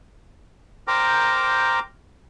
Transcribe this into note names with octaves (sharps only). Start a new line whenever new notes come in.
A#4 C5 G5 A#5 D6